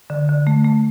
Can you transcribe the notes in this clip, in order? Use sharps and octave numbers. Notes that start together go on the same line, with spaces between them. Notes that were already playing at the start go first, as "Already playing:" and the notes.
D3
D3
A3
A3